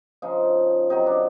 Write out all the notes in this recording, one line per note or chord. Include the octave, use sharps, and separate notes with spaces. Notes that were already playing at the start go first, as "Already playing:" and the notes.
C#3 F3 D#4
C3 D#3 F#3 D#4
D4